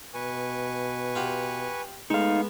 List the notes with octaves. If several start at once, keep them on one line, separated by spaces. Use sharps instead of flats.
B2 B4 G#5 C#6
F4 G4 F#5
G#3 A3 B3 D#4 F5